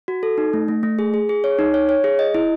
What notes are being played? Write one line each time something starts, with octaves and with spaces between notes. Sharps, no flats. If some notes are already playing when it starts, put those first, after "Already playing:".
F#4
A4
D#4
A3
A3
A3
G#4
G#4
G#4
C#5
D#4
C#5
C#5
G#4
D#5
E4